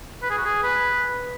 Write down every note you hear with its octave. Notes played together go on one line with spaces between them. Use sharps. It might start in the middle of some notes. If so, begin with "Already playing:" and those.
B4
G#4
F#4
G#4
B4